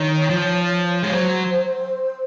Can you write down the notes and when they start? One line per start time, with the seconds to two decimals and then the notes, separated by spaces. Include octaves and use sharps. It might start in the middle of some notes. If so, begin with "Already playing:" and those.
Already playing: D#3 C#5
0.30 F3
1.02 G#3 C#5
1.13 F#3 C5